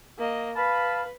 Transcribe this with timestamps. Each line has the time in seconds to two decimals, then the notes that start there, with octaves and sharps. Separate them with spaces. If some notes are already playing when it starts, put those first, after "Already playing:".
0.18 A#3 D#5
0.55 B4 F5 A5 B5